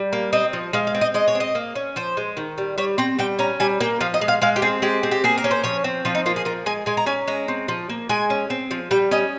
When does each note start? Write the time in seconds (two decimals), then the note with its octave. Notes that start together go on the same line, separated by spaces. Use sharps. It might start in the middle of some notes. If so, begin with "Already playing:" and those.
Already playing: G3
0.13 A#3
0.33 C4 D#5
0.53 F3
0.73 G#3 F5
0.87 F5
0.95 C4
1.01 D#5
1.14 G#3 D#5
1.28 C#5
1.35 C4
1.40 D#5
1.55 A#3
1.75 C#4
1.96 F3 C5
2.17 G#3
2.37 D#3
2.58 G3
2.78 G3 C#5
2.98 C4 G5
3.19 G3 G5
3.39 C#4 A#5
3.60 G3 G#5
3.80 A#3 G5
4.00 F3 F5
4.14 D#5
4.21 G#3
4.28 F5
4.42 G#3 F5
4.56 G4
4.62 C4 G#4
4.82 G#3 G4
5.03 C4
5.11 G4
5.24 A#3 G#4
5.38 A#4
5.44 C#4
5.51 C5
5.64 F3 C#5
5.84 C4
6.05 F3 F4
6.15 D#4
6.26 A#3 F4
6.36 G#4
6.45 F3 A#4
6.66 G#3 G#5
6.86 G#3 G#5
6.97 A#5
7.06 C#4 G#5
7.27 G#3 A#5
7.48 C4
7.68 F3
7.90 A#3
8.09 G#3 G#5
8.30 C#4
8.50 C4
8.71 F3
8.91 G3 G5
9.11 C#4 D#5